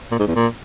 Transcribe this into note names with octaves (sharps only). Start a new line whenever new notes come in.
A#2
G#2
E2
A#2